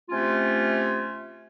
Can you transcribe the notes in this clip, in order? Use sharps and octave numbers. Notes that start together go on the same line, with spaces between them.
C3 A3 C#4 F4